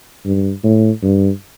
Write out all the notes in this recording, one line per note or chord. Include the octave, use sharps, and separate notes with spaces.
G2
A2
G2